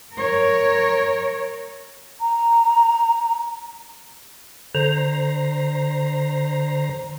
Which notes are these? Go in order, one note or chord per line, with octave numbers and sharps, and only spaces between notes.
A#4 C#5
A#5
D3 C5 A#5